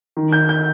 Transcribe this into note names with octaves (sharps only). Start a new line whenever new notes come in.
D#3
G6
G6